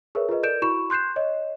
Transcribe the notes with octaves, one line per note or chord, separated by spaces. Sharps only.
G#4 A#4 B4 C#5 E5
F4 G#4 B4 D#5
A4 A#4 D5 G6 D7 E7
E4 F#4 B5 C#6 E7
C6 F#6 G6 C7 E7
C#5 D#5